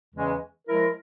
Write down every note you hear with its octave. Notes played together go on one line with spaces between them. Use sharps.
E2 C#3 E3 G#3 C#4
F3 G#3 E4 A#4